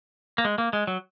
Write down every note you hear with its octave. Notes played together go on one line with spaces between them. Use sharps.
A#3
G#3
A#3
G#3
F#3